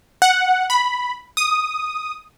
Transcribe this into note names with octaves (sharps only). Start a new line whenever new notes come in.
F#5
B5
D#6